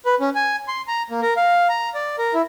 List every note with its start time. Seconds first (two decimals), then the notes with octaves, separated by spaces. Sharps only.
0.06 B4
0.20 C#4
0.35 G#5
0.68 C6
0.88 A#5
1.10 A#3
1.22 A#4
1.37 F5
1.69 A#5
1.94 D5
2.19 A#4
2.34 E4